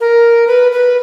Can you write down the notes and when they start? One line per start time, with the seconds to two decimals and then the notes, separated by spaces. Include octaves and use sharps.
0.01 A#4
0.47 B4
0.72 B4